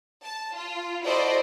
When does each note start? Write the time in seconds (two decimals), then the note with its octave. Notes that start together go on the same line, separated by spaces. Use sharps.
0.23 A5
0.56 F4
1.03 E4 F#4 A4 C5 D5 D#5